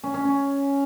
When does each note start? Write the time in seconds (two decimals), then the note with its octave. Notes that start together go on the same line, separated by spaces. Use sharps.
0.04 C#4
0.14 C#4
0.25 C#4